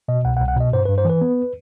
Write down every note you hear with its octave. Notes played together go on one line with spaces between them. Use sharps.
B2 D#5
C2 F#5
F#5
C2
F#5
B2 D#5
G2 C5
G2 B4
C5
E3 B4
B3